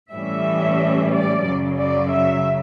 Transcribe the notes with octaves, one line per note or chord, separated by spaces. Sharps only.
A2 E3 G3 C#4 E5
D5
F#2 C#3 F#3
D5
E5